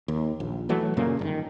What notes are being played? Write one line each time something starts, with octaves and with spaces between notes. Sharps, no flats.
D#2
A#1
E3 F#3 A3
F#2 A#2 C#3 A#3
G1 A#2 D#3